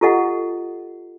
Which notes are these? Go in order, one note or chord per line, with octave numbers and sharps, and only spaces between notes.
F4 G4 A4 D#5 F#5